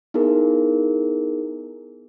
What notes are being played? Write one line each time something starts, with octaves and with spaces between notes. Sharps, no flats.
B3 D#4 E4 G#4 A#4